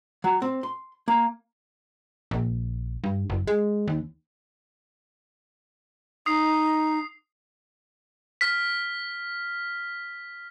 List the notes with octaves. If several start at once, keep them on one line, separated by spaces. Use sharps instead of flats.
F#3
C4
C6
A#3
A#1
G2
F#1
G#3
D#2
D#4 D#6 C7
F6 B6